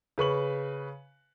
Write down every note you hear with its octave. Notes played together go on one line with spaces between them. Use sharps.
C#3 B4 C#6 F#7